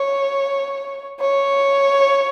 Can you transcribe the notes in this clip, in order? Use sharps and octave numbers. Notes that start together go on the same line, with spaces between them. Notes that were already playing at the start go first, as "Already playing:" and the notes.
Already playing: C#5
C#5